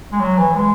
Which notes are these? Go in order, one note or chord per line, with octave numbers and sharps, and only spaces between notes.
G#3
F#3
E3
G#3